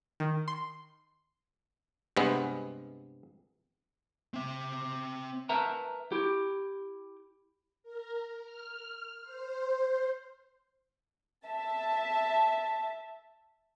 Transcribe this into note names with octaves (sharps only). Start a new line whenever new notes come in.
D#3
C6
G2 C3 G#3 B3
C4 E5
A#4 B4 E5 A5 A#5
E4 G4
A#4
F6
C5
E5 A5